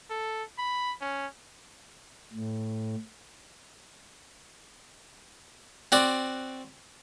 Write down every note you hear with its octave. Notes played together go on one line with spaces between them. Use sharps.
A4
B5
C#4
A2
C4 F#4 D5